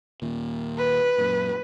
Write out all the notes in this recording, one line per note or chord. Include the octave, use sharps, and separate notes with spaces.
D#2 A#2
B4
F#2 A#2